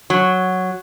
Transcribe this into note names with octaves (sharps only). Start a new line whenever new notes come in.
F#3